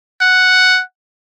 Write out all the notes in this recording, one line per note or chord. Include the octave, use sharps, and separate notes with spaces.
F#5